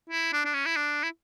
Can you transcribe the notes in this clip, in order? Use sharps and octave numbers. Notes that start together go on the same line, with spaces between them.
E4
D4
D4
C#4
E4
D4
E4